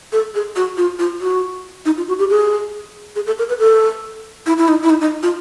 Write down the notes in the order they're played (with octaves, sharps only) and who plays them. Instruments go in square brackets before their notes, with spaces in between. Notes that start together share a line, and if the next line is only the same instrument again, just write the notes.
[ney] A4
G#4
F#4
F4
F4
F#4
D#4
F4
F#4
G4
G#4
G#4
A4
A#4
B4
A4
E4
E4
D#4
E4
D#4
D#4
F4